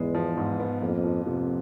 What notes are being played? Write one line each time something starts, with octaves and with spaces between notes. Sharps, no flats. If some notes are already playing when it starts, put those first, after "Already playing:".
Already playing: E2 G#2 G#3 B3
F3
G#2
B3
F2 A#3
F3
F2 C3